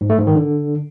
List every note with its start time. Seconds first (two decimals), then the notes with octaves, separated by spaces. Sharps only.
0.01 G#2
0.10 A3
0.18 G#2
0.27 D#3
0.36 D3